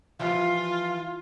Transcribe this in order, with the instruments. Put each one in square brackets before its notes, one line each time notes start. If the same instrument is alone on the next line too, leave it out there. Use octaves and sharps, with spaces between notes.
[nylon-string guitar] E3 F3 G3 [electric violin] F4 [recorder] F5